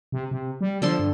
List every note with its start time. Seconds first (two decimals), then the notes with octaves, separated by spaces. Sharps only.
0.12 C3
0.31 C3
0.61 G3
0.82 D3 F3 A4 C6
0.99 G2